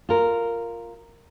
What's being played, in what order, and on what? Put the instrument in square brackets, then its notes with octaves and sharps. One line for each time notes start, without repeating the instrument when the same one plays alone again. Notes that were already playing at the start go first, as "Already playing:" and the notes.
[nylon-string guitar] F4 A#4